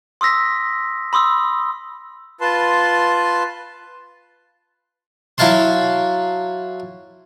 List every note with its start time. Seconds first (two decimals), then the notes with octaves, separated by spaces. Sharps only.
0.21 C6 D#6 E6 A#6 B6
1.13 B5 C6 D#6 E6
2.41 F4 B4 A5 C6
5.38 F#3 E4 F5 A5 C6